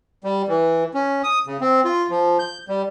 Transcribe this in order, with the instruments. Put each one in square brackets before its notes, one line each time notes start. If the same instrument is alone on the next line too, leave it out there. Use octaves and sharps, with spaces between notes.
[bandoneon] G3
E3
C#4
D#6
C#3
C4
F4
F3
G6
G3